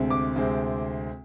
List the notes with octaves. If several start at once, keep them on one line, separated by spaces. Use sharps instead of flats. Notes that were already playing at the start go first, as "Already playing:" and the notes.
Already playing: D2 C3 G#3 C4
D6
D2 C3 G#3 C4